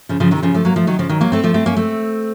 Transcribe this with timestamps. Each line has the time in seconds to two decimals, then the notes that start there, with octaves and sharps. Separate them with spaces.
0.09 C#3 F3
0.20 C#3 F3
0.31 C3 D#3
0.42 C#3 F3
0.54 F3 A3
0.65 F#3 A#3
0.76 F3 A3
0.87 D#3 F#3
0.99 C#3 F3
1.09 D#3 F#3
1.21 F#3 A#3
1.32 A3 C4
1.43 F3 A3
1.54 A3 C4
1.66 A#3 C#4
1.76 A3 C4